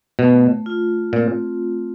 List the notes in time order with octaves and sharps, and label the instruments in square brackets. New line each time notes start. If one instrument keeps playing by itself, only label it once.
[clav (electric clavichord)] B2 [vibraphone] A3
[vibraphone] F4
[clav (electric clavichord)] A#2 [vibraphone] C4